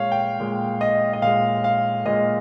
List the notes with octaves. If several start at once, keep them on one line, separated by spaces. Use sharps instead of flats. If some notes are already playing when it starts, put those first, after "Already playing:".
Already playing: A#2 G#3 C#5 F5
G5
A#2 G#3
D#5
D#5
A#2 G#3 F5
F5
A#2 G#3 D#5